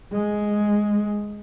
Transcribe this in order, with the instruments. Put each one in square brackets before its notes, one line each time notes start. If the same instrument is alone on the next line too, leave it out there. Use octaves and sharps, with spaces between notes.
[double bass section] G#3